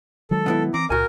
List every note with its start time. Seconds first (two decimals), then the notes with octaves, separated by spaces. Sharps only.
0.31 D#3 F#3 G#3 A4
0.46 B2 B3 E4
0.74 E3 C4 A#5 D6
0.90 C#2 A#2 F#4 A#4 G#5